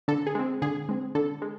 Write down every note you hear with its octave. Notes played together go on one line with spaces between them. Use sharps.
D3 A4
G#4
G#3 C4
D3 G#4
G#3 C4
D3 A4
G#3